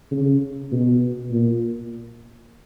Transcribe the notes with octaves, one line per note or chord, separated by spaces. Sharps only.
C#3
B2
A#2